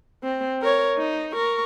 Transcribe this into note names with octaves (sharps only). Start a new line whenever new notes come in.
C4
A#4 C#5
D#4
A#4 C#6